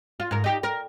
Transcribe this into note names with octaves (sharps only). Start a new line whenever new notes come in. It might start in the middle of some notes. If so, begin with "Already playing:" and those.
F4
G#2 A#4
D#4 G4
A#4